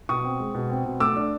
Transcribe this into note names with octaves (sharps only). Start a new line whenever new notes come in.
B2 C#6 D#6
C4
G#3
B2
C4
B2
A3 D6 E6
D4